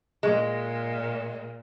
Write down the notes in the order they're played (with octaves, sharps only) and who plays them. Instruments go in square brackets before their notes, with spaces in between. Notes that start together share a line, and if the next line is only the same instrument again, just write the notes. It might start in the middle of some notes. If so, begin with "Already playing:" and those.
[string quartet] A#2 [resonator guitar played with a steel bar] G#3